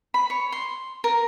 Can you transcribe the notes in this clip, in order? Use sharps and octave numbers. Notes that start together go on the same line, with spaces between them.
B5
C#5
C6
A#4